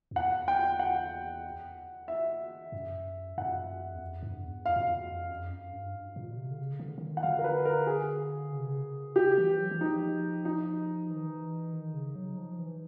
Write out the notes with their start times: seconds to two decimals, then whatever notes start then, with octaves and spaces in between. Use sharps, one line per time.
0.11 F2
0.16 E2 F#5
0.48 G5
0.79 F#5
2.08 E5
2.72 F#2
3.38 F#2 F#5
3.94 E2
4.02 F2
4.22 G2
4.45 E2
4.66 F2 F5
4.76 F#2
4.84 F2
5.30 F#2
5.47 F2
5.51 F#2
5.73 G2
6.16 A#2
6.30 B2
6.37 C3
6.51 D3
6.59 C#3
6.80 D3
6.98 D3
7.02 D#3
7.17 F#5
7.23 D3 F5
7.39 A#4
7.44 B4
7.65 A#4
7.87 G#4
8.52 C#3
8.59 C3
8.67 C#3
9.16 G4
9.37 E3
9.59 F#3
9.71 E3
9.80 F3 D#4
10.45 D#4
11.09 E3
11.16 D#3
11.23 E3
11.73 D#3
11.94 C#3
12.16 F#3
12.38 F3
12.59 E3